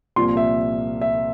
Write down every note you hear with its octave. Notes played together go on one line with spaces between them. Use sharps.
C2 A#2 F3 C6
E5
E5